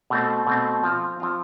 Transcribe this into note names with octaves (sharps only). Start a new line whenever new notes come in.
B2 A3 C4
B2 A3 C4
F3 C4 F4
F3 C4 F4